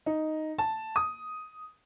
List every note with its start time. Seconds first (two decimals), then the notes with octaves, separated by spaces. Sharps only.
0.06 D#4
0.58 A5
0.96 D#6